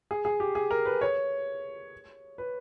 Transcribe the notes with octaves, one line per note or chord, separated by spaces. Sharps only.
G#4
G#4
G4
G#4
A#4
B4
C#5
B4